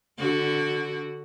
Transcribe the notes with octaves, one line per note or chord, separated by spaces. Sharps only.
D3 F#4